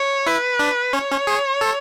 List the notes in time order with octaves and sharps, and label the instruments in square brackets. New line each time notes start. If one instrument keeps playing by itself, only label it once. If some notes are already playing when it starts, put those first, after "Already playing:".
Already playing: [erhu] C#5
[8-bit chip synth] E4 [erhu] B4
[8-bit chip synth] D4
[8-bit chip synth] C#4 [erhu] C#5
[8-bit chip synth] C#4
G#4
A4